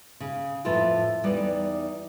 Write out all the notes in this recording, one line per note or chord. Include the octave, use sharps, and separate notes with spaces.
C#3
F2 A2 E4 F4 A4 B4
E2 G3 D#4 E4 B4 D5